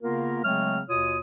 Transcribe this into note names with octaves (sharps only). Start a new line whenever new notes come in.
C#3 A#3 B3 F4 A#4
C#3 F#3 G#3 A3 C4 F6
D#2 B2 F4 C#5 D#6